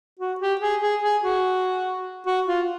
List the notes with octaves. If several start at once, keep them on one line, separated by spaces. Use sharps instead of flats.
F#4
G4
G#4
G#4
G#4
F#4
F#4
F4